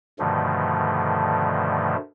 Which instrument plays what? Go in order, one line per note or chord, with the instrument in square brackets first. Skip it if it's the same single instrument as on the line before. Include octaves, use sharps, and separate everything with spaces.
[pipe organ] G2 B2 D3 D#3 F3 A3